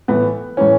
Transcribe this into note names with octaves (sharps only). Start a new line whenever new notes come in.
A2 E3 B3
A2 E3 C#4